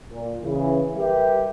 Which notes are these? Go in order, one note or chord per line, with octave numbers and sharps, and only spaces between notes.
A#2
C#3 E3
G3 G4 A#4 B4 E5